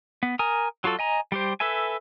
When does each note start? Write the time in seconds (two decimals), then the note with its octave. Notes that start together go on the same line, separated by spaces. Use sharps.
0.23 B3
0.39 A#4 G#5 A#5 D#6
0.84 F#3 F4 F#4 A4
0.99 D#5 G#5 A#5
1.32 G3 G4 C5
1.60 A4 B4 E5 G#5